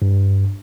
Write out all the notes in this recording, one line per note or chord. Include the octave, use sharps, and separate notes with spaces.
G2